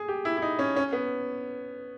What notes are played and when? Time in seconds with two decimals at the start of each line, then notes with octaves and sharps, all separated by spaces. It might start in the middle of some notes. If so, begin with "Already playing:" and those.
Already playing: G#4
0.08 G4
0.25 E4
0.37 E4
0.42 D#4
0.59 C#4
0.76 C#4
0.93 B3